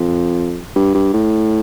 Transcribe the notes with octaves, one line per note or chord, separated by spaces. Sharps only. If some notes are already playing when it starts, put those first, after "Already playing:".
Already playing: F2
G2
G2
A2